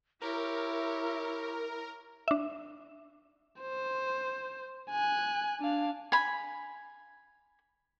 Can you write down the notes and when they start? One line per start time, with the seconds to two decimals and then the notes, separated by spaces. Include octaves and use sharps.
0.21 E4 G4 A#4 C#5
2.28 D4 E5
3.60 C5
4.91 G#5 F#6
5.61 D4 F5
6.12 G#5 B5